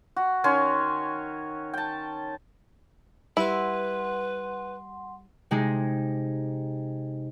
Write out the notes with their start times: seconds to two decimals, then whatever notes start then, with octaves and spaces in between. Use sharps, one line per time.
0.16 F#4
0.44 D#3 C#4 C#5 C6
1.73 G5 A5
3.37 G3 E4 B4 F#5 C6
5.51 C3 G#3 D#4 G#4